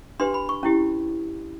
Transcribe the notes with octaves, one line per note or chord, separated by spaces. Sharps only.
D4 G4 B4 C6
B5
C#6
C#4 E4 G4